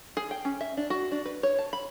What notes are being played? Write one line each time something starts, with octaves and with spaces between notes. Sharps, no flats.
G#4
G5
C#4
E5
D4
F#4
D4
B4
C#5
A5
B5